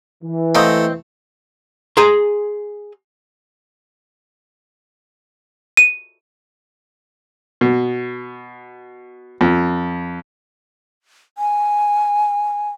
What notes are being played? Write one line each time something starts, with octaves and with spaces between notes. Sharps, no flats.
E3
A3 A#3 C4 D#5
G#4 G#5 A#5 C6
D#7
B2
F2
G#5